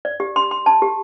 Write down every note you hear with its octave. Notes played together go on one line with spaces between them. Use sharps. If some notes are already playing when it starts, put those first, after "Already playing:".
D5
G4
C6
C6
A5
G4